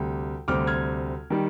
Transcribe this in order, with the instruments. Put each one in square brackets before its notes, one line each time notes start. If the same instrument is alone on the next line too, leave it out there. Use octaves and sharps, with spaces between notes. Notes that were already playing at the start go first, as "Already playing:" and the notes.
Already playing: [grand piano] D2 C3 G3 G5
D2 C3 G3 C4 D6 F6
F6 G#6
D#3 G3